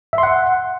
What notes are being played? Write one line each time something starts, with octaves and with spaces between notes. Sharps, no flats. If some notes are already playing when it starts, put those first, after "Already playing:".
E5
C6
F#5